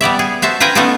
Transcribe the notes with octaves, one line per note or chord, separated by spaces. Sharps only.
G3 B3 D5 E5
G#4
F#4 C5 E5 A5
F4 B4 G5 G#5 A#5
A3 B3 C#4 D#4 F4 A4